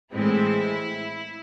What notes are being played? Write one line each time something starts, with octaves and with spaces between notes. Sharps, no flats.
A2 E3 G#3 C4 E4